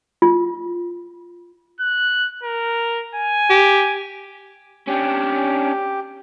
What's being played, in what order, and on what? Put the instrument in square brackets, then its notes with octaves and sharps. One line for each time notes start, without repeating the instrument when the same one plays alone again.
[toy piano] F4
[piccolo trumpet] F#6
A#4
G#5
[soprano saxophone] G4
[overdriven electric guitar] C#4 D4 [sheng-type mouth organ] G4